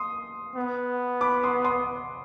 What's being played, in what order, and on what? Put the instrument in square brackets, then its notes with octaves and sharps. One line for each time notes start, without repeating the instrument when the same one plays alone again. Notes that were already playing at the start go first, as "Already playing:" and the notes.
Already playing: [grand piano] C6 D#6
[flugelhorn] B3
[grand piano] B5 D6
C6 D#6
C6 D#6